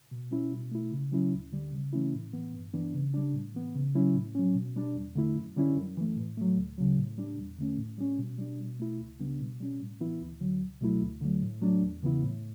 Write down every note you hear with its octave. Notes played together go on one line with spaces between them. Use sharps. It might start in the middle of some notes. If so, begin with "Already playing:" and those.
B2
G3 C#4 E4
B2
A3 E4
C#3
F#3 C#4 E4
D2
D3 G3
C#3
E3 A3 C#4 E4
A2
E3 B3
G2
E3 B3 D4
C#3
G3 D4
A2
E3 B3
C#3
F#3 C#4 E4
A2
F#3 C#4
B2
G3 D4
E2
D3 A3 E4
F#2
D3 G3 C#4 E4
F#2
E3 A3
A2
F#3 A3
D2
C#3 F#3
A2
G3 D4
E2
D3 A3 C#4
A2
G3 C#4
B2
G3 D4
B2
A3 E4
C#2
C#3 G3 B3 D4
B2
G3 C#4
A2
E3 B3 E4
D2
D3 F#3
C#2
B2 F#3 A3 E4
D2
D3 F#3 A3
A2
F#3 A3 D4
E2
C#3 E3 B3 E4
A2